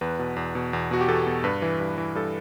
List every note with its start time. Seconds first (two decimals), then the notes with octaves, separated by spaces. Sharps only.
0.01 E2 B4
0.19 B2
0.36 E2
0.55 B2
0.73 E2
0.91 B2 F#4
1.01 G4
1.08 E2 A4
1.27 B2
1.44 G2 B4
1.62 E3
1.80 G2
1.98 E3
2.15 G2 A4